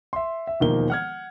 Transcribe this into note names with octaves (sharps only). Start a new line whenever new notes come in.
E5 C6
E5
E1 D#2 D#3 F3 A#3 G7
F#5 F6 G#6